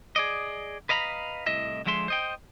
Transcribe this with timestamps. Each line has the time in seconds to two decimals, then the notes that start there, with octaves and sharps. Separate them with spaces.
0.16 G#4 D5 D#5
0.89 B4 D#5 F5 A#5 B5
1.46 C2 A2 D#5 E5
1.86 D3 F3 G#3 E5 C6
2.08 C5 D#5 G5